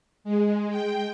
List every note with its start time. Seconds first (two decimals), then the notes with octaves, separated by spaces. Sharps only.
0.24 G#3
0.70 G5